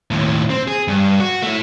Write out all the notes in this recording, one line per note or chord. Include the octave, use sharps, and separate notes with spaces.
D#2 A2
C4
G#4
G2
F#4
A3 E4